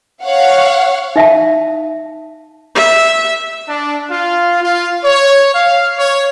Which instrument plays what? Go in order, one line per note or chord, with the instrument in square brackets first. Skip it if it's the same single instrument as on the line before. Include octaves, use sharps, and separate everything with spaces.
[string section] C#5 F5 F#5
[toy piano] D#4 E5 F5 A5
[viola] E5
[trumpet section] D4
F4
F4
C#5
F5
C#5